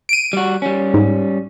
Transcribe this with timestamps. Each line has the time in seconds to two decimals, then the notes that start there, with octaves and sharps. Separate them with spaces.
0.09 D7 D#7
0.33 G3 F#4
0.62 G3 C#4
0.94 G#2